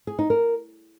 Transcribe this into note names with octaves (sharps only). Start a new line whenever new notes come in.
G#4
D#4
A#4